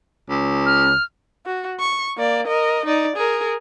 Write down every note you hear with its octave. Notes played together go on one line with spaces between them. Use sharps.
C#2
F6
F#4
C#6
A#3 D5
A#4 D#5
D#4 D5
G#4 A#4